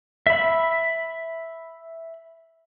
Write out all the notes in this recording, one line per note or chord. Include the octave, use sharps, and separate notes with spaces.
E5 B5